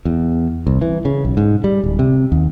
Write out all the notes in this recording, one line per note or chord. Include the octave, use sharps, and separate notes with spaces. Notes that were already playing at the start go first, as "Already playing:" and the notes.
E2
C2
E3
C#3
B1
G#2
G3
D1
C3
D#2